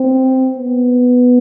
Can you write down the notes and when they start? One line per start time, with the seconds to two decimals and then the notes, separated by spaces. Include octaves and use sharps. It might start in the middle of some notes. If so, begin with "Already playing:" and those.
Already playing: C4
0.57 B3